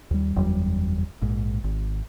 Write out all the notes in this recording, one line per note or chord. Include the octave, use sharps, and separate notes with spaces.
D#2 G3
F#1 E2 F#3 G3
A#1 G#2
G#1